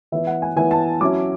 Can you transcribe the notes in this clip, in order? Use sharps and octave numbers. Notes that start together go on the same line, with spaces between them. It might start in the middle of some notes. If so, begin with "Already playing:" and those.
E3 B3 E4 E5
F#5
G#5
E3 B3 E4 G#5
A5
F#3 C#4 E4 D6